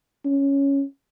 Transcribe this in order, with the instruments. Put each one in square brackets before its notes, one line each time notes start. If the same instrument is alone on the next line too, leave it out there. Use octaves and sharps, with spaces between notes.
[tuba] C#4